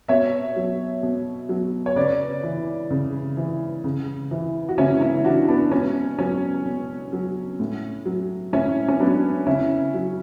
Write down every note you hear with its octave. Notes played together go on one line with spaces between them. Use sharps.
B2 C#5 E5
F#3
B2
F#3
C#5
C#3 B4 D5
E3
C#3
E3
C#3
E3
F#4
C#3 C#4 E4
C#4 E4
E3 D4 F#4
B3 D4
B2 C#4
F#3 C#4
B2
F#3
A2
F#3
A2 C#4 E4
C#4
F#3 B3 D4
C#3 C#4 E4
F#3